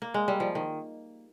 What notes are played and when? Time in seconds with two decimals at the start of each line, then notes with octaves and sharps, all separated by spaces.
0.02 A#3
0.14 G#3
0.28 G3
0.40 F3
0.55 D#3